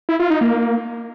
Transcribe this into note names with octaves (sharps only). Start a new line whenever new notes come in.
E4
F4
D#4
A#3